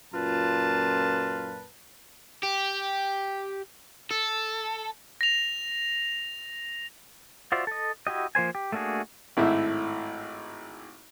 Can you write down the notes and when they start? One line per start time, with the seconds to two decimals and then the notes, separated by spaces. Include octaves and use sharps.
0.14 F#2 A#2 F4 B4 A5
2.43 G4
4.11 A4
5.21 A#6 F7
7.52 F4 F#4 C5 D5 E5
7.67 A4 D#5
8.07 E4 F#4 G4 D#5
8.35 F3 A#3 C5 G#5
8.55 G4
8.72 A3 A#3 D4 F#4 G#4
9.37 G#1 A2 E4